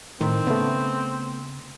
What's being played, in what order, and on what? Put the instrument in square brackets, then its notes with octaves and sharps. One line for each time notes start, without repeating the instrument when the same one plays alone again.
[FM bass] A2 [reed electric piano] D#3 [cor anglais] C4
[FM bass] C#3 [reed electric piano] A3 B3